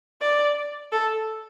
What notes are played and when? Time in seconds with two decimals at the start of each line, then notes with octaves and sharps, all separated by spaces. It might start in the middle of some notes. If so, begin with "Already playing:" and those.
0.21 D5
0.92 A4